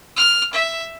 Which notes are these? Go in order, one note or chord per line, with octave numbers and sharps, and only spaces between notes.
F6
E5